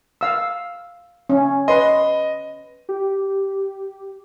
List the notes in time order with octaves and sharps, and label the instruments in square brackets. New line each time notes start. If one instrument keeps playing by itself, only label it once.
[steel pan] F5 E6
C#4
[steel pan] B4 C6 [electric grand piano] D#5
[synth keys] G4